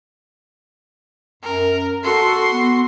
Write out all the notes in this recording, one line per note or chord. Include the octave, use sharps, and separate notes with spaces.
F#2 A#4
F#4 A4 C6
B3